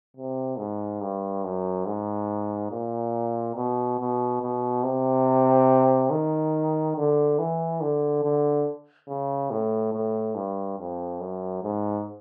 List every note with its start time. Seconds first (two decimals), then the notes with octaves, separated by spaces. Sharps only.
0.17 C3
0.58 G#2
1.01 G2
1.44 F#2
1.86 G#2
2.71 A#2
3.56 B2
3.99 B2
4.42 B2
4.83 C3
6.10 D#3
6.96 D3
7.39 E3
7.81 D3
8.23 D3
9.08 C#3
9.50 A2
9.93 A2
10.35 G2
10.78 F2
11.20 F#2
11.63 G#2